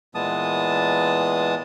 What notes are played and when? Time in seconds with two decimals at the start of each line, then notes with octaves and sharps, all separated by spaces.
0.15 A#2 E3 G#3 B3 A5 D#6